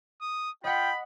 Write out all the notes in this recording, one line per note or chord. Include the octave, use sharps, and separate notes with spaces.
D#6
F4 D#5 F#5 G5 B5